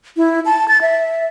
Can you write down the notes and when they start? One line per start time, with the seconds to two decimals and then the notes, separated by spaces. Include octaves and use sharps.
0.17 E4
0.45 A5
0.68 A6
0.82 E5